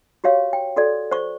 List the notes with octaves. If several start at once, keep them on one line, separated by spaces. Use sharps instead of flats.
F#4 G4 C#5 F5
G5
F#4 A4 D5
C5 C#6